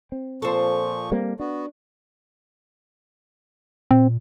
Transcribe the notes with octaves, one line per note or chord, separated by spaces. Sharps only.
C4
A#2 F3 A4 C5 C#6
G3 A#3 C4
B3 D4 F#4
A#2 C4